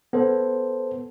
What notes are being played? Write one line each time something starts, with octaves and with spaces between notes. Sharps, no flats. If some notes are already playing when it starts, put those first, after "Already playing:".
B3 A4 C5